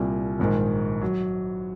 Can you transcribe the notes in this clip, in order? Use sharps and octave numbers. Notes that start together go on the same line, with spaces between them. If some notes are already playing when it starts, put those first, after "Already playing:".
Already playing: C2 A#2 G3
A#1 G#2 D#3
F#3